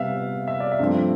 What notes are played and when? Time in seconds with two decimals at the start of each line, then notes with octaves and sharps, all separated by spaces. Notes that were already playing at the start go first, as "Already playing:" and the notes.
Already playing: C3 G3 B3 E5 F5
0.47 E5
0.60 D5
0.72 E5
0.79 G2 F3 A3 C4